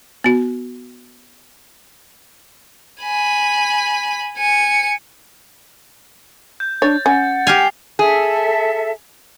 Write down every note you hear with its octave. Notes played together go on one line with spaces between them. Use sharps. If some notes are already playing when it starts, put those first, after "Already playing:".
B3 F#4
G#5 B5
G#5 C#7
G6
D4 C#5 A6
C#4 F#5
G4 G#5 F6 C7 F7
G#4 A4 E5